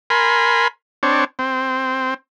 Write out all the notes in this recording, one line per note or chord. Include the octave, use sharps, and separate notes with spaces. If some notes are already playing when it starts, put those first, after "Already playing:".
A#4 G#5 B5 C6
C4 D4 C#5
C4